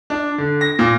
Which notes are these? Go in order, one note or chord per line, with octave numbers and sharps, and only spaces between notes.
D4
D3
A#6
A#2